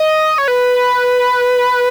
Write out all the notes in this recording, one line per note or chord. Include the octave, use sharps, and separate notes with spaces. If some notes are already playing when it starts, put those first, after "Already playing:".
Already playing: D#5
C#5
B4